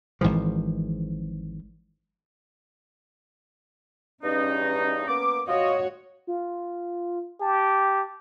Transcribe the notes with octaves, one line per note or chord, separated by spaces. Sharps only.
G#1 G#2 E3 F3
E2 G2 C#4 D#4
A#3 B3 D6
F4 F#4 C#5 D#5
F4
G4 A5